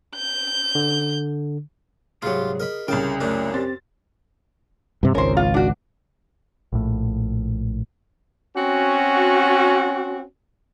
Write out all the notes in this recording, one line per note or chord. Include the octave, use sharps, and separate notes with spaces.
G6
D3
C2 G#2 F#3 F4 G4 G#4
A#4 D#5 B5
C2 C#3 A#4 G5 A5
F#2 F#3 A3 D4
C4 G4 A6
G2 C3
G#1 C#2 C#4 A#4 C5
F4
D4 F#4
A#1 A2
C4 C#4 F#4